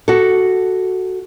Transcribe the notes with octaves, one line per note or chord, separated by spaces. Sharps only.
F#4 A4